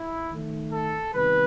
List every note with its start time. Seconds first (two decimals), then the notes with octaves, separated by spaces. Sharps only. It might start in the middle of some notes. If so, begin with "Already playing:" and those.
Already playing: E4
0.32 D#3 A3
0.73 A4
1.14 C3 D#3 G3 B3 B4